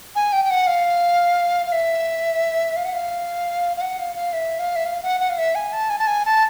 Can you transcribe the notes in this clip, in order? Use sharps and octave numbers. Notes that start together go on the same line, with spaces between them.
G#5
G5
G5
F#5
F5
F5
E5
F5
F#5
F5
F5
F#5
F5
F5
E5
F5
E5
F5
F#5
F#5
F5
E5
G#5
A5
G#5
A5
G#5
A5